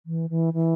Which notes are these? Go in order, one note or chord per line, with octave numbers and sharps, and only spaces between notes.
E3
E3
E3